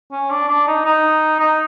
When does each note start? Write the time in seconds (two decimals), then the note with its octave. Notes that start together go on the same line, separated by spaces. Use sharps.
0.12 C#4
0.30 D4
0.48 D4
0.67 D#4
0.85 D#4
1.40 D#4